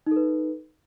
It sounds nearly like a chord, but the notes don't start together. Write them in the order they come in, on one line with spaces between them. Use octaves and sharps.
D#4 A4 B4